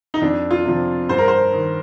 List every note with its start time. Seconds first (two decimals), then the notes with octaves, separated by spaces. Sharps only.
0.14 D#4
0.22 F2 D4
0.51 F4
0.65 C3 F3
1.09 G2 C5
1.18 A#4
1.28 C5
1.53 D#3